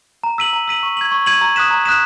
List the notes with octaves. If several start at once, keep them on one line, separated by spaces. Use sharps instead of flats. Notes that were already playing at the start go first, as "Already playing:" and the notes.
A#5
E6 B6 D#7 F#7
A#5
E6 B6 D#7 F#7
C#6
G#6 D#7 F#7
C#6
G#6 D#7 F#7
A#5
D#6 F#6 B6 E7
A#5
D#6 F#6 B6 E7